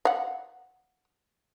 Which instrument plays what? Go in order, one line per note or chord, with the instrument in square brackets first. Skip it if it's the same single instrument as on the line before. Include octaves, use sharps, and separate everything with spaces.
[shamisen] F5 F#5